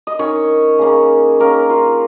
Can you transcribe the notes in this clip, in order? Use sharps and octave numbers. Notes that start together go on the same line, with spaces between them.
D#5
D#3 C#4 C#5
C#3 A#3 C#4
D#3 A#3 C#4 A#4
F4